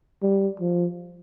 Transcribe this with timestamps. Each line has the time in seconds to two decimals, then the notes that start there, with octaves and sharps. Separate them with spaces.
0.23 G3
0.60 F3